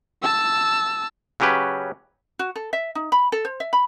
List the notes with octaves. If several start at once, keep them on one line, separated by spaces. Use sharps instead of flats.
A5 E6
C#3 F#3 C#4 G4 B4
F#4
A4
E5
D#4
B5
A4
C5
E5
B5